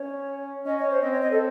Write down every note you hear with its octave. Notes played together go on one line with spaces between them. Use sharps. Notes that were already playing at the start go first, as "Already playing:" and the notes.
Already playing: C#4 C#5
C#4 D#5
C#5
C5
C4 D#5
C#5
D#5
A4